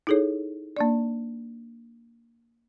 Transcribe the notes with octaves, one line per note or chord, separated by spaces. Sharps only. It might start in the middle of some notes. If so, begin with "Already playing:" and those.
D#4 E4 G#4 A4 C#5
A#3 D4 D5